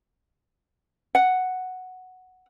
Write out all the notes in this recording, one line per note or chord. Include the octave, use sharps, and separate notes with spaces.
F#5